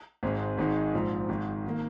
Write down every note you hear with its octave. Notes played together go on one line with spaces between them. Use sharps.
G#1 G#2 G#3 C4
G#1 G#2 D#3 G#3 D#4
A#1 G#2 F3
G#1 G#2 D#3
D#3 A#3